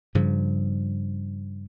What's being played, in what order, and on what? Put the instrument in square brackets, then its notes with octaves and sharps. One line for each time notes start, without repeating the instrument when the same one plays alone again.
[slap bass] G2 C#3 F3